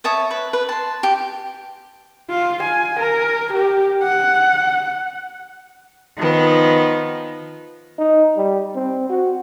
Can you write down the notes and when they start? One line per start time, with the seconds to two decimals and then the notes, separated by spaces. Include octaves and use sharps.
0.04 C#5 E5 A5 D#6
0.31 B4
0.53 B4
0.69 A5 C6
1.03 G4
2.30 F4
2.64 G#5
3.00 A#4
3.54 G4
4.03 F#5
6.18 D#3 F3 B3
7.98 D#4
8.36 G3
8.75 C4
9.09 F#4